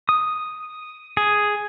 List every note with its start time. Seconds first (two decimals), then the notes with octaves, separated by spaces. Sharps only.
0.09 D#6
1.17 G#4